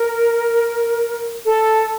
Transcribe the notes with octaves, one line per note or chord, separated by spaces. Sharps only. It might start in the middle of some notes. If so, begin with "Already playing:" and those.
Already playing: A#4
A4